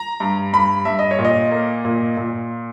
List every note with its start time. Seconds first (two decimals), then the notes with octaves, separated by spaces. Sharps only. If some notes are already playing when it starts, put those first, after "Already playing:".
Already playing: A#5
0.20 G2
0.53 G2 B5
0.85 G2 E5
0.99 D#5
1.11 C#5
1.19 A#2
1.25 D#5
1.51 A#3
1.85 A#2
2.17 A#2